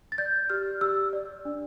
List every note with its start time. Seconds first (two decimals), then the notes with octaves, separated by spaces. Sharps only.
0.12 A6
0.18 D5 G6
0.50 G4 F6
0.81 G4 E6
1.13 D5
1.45 D4